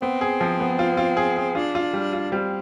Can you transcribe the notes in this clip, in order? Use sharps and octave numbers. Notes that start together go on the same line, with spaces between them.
B3 C4
G#4
F3
B3
F4
F4
G#4
G#4
D4 F4
F4
G3
F4
G3 C4